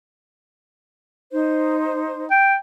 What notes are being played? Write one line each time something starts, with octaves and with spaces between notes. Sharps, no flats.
D#4 C5
G5